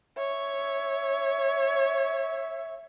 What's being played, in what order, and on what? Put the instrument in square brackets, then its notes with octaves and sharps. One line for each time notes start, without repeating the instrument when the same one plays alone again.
[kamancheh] C#5 [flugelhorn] E5